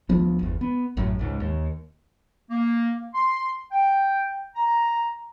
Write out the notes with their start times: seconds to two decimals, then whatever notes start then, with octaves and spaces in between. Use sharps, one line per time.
0.09 D2 F3 B3
0.39 G1 E2
0.61 B3
0.97 A1 F#2 A2
1.19 C#2 G#2
1.40 D#2
2.51 A#3
3.14 C6
3.71 G5
4.55 A#5